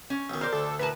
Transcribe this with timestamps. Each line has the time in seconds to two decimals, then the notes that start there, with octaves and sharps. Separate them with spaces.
0.10 C#4
0.30 B1 D#3
0.41 A#4 C5 D5
0.53 D2 A4
0.79 A2 A#4 B4 A5